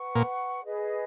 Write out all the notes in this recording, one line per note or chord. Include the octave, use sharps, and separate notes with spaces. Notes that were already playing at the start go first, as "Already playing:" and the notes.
Already playing: B4 F#5 C#6
A#2
G#4 B4 D#5